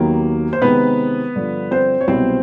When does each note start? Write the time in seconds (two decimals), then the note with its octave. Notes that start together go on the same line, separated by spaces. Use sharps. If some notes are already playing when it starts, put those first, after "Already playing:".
Already playing: D#2 D#3 F#3 A#3 B3
0.53 C5
0.62 C3 D#3 G#3 B3 C4 D#4 B4
1.35 G2 D3 F3
1.71 C4 C5
2.01 C#5
2.08 C2 B2 F#3 B3 C4 C5